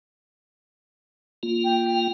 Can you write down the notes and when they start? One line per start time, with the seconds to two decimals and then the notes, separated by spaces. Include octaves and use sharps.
1.43 A#3 F4
1.64 G5